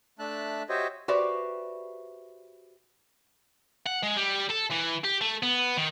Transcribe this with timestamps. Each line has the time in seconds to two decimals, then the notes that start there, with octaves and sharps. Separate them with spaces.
0.19 A3 D4 E5 A5 F#6
0.69 F#4 G4 C5 C#5 D#5 E5
1.08 F#4 G4 B4 C5 D5 E5
3.86 F#5
4.03 G#3
4.16 G3
4.49 A4
4.71 E3
5.04 G4
5.21 A3
5.43 B3
5.77 D#3